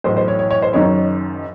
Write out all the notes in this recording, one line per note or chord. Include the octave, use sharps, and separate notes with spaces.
B1 A2 E3 C5
C5
C#5
C#5
C#5
C5
F#1 F#2 D#3 C#5